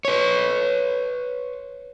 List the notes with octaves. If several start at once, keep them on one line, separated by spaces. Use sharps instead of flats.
B4 C#5